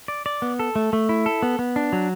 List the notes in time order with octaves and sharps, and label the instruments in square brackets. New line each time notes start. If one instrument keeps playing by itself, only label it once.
[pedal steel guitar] D5
D5
B3
A4
A3
A3
E4
A4
B3
B3
D4
F#3